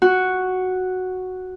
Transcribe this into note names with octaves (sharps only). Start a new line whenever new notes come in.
F#4